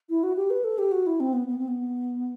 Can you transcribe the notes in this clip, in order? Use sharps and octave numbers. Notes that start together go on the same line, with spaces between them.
E4
F#4
G4
B4
A4
G4
F#4
E4
C4
B3
B3
C4
B3